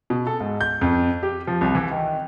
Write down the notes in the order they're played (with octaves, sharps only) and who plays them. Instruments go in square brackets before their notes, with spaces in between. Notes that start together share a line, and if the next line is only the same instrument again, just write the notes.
[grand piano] B2
A4
G#2
G6
F2
G4
F3
C2
E3
D#3